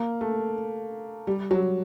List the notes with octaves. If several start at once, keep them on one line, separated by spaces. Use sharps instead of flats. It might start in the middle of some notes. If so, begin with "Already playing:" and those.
Already playing: A#3
A3
G3
F#3